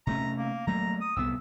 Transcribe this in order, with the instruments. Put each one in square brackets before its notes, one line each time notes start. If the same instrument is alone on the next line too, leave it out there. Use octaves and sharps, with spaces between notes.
[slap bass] C3 A3 C#4 [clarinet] A#5
[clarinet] A#3
[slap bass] F#3 A3 A#3 [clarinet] A#5
[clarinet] D#6
[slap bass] C2 C3 B3 [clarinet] E6